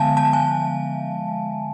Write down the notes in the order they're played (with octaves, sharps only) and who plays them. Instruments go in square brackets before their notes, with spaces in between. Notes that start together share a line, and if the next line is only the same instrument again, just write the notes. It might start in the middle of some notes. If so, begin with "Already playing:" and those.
Already playing: [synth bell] D3 F3 G#3 B3 E5 F5 G#5 A5
A5
G#5